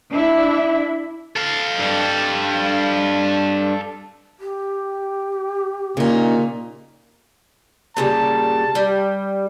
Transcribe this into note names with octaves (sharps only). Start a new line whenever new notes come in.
D4 E4 E5
A4 F5
G2 G3
G4
A#2 C#3 D#4
A#2 C#3 G3 A5
G3